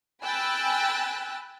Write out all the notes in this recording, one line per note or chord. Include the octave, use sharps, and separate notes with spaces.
G5 G#5 B5 E6 F#6 A6